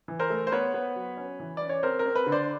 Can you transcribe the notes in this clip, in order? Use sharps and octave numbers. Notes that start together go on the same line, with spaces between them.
E3
A#4 C5
A3
C5
B3 B4 C#5
B3
F#3
C#4
E3
C#4 D5
C#5
C4 A#4 C5
A#4
C4
B4
D3
C5 D5